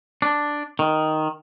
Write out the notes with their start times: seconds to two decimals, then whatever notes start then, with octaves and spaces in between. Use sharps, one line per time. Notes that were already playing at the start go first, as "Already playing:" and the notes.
0.22 D4
0.79 D#3